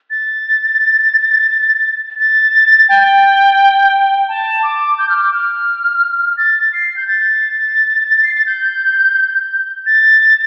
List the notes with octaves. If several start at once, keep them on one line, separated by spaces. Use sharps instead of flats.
A6
A6
G5
A5
D6
G6
F6
D6
F6
A6
C7
G6
A6
C7
A6
G6
A6